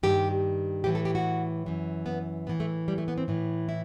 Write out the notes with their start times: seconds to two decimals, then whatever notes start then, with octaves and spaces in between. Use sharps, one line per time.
0.03 G2 D#3 G4
0.84 A2 E3 G4
0.95 A4
1.05 G4
1.15 F#4
1.66 F#2 E3
2.06 B3
2.47 A2 E3 B3
2.60 A3
2.88 G3
2.98 A3
3.08 B3
3.18 C4
3.28 A2 E3
3.69 E4